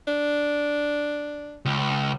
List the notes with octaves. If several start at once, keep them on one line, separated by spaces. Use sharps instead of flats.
D4
C#2